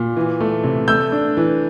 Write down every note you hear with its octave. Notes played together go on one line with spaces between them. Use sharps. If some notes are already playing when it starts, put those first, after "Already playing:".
Already playing: A#2
E3
A3
C3
A3 E6 G6
D4
E3